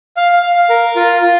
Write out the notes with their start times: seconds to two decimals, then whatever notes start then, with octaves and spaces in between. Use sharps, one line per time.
0.17 F5
0.43 F5
0.70 A#4
0.96 F4
1.22 F4